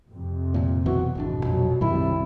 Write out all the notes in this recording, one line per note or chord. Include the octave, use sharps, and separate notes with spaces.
F2 C3
A#2 F3
B2 E3 F#3 F#4
G#1 F2 B2 D4
F2 A#2 F#3
B1 F#2 C3 D#3 G3 E4